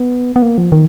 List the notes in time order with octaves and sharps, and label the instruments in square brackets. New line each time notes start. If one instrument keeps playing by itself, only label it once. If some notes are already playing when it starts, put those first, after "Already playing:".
Already playing: [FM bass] B3
B3
A#3
F3
D#3